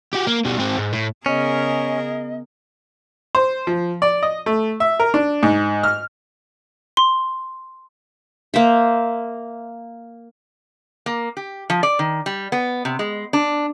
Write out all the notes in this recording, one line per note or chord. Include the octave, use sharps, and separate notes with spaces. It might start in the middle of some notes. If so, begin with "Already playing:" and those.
F#4 G4
A#3
B2 G3
G#2 C4
G#2
A2
C#3 B3 C#4 G#4 A#4 D#5
C5
F3
D5
D#5
A3
E5
A#4
D4
G#2
F6
C6
A#3 C5 E5
A#3
G4
F3
D5
D#3
G3
B3
C3
G#3
D4